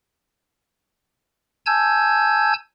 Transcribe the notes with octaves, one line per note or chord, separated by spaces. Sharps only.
G#5 A5 E6 G6 G#6